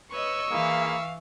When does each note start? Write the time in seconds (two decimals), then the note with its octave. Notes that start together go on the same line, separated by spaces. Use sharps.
0.11 B4 C#5 D#5 C#6 E6
0.52 E3 A#3 G#4 F5 B5